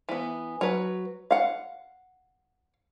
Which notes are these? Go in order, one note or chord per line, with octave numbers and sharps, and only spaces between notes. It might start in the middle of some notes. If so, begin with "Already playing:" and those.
E3 B3
F#3 B4
F5 F#5